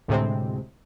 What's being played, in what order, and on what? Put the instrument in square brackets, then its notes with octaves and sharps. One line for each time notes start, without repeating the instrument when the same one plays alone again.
[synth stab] D2 A2 C3 G#3 C4